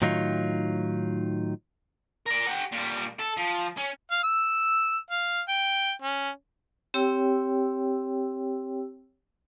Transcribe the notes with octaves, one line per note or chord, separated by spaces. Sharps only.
A2 D#3 F#3 D#4 F4
A#4 D5
G4 F#5
A#2 G3
A4
F3
C#4
F5
E6
F5
G5
C#4
C4 G4 C#5 G5 E6